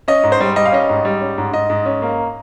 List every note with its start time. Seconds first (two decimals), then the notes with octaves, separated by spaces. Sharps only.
0.08 C#4 D#5
0.23 G#2
0.32 C5
0.41 G3
0.56 G3 D#5
0.66 F5
0.72 C#4 D#5
0.89 G#2
1.05 G3
1.21 C#4
1.38 G#2
1.53 G#2 D#5
1.70 G#2
1.85 C#4
2.02 A#3